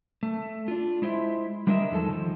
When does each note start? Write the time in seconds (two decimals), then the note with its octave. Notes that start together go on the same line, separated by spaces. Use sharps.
0.23 A3
0.68 D4 F4
1.02 G#3 E4 C5 D#5 E5
1.67 G3 G#3 D4 A#4 D#5 E5
1.91 E2 D#3 F3 G#3 A4 A5
2.10 D#3 F3